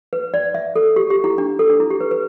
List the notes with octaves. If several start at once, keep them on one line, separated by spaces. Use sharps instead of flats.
B4
D5
E5
A4
G4
G4
E4
D4
A4
D4
E4
G4
B4
B4